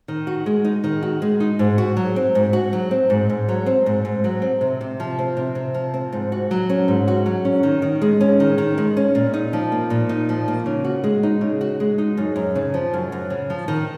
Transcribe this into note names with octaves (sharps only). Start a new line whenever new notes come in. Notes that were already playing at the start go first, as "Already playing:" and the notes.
D#3
F#4
G#3
D#4
D#3
F#4
G#3
D#4
G#2
F#4
F#3
C4
G#2
F#4
F#3
C4
G#2
G#2
F#3
C4
G#2
G#2
F#3
C4
C3
C3
F3
C4
C3
C3
F3
C4
G#2
F#4
F#3
C#4
G#2
F#4
F#3
C#4
D#3
D#3
G#3
C#4
D#3
D#3
G#3
C#4
A#2
D#4
F3
A#3
A#2
D#4
F3
A#3
C#3
F#4
G#3
D#4
C#3
F#4
G#3
D#4
F#2
F#2
C#3
F3
F#2
F#2
C#3
F3
D#3